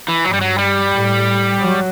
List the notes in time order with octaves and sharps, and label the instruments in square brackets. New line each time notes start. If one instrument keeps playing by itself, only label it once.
[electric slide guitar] E3
[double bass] G2 [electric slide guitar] F#3
[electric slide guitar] G3
F#3
G3
[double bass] A2
F#3